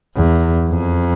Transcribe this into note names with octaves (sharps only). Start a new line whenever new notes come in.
E2
F2